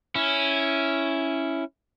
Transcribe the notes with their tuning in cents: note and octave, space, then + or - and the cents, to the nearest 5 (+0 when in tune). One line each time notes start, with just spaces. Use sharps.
C#4 +0 E4 +0